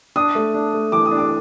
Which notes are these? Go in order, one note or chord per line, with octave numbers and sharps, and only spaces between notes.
D4 D#6
A3
D4
A3
E3 D6
D#6
D4
D6